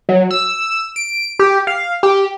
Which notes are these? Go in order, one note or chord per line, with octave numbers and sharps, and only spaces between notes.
F#3
E6
D7
G4
F5
G4